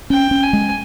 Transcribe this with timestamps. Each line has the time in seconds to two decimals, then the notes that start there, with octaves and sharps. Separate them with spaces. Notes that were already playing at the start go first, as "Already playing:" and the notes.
0.10 C#4 G5
0.31 C#4
0.42 G#5
0.53 G#3